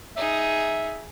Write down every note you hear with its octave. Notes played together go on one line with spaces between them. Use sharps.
D#4 G#4 E5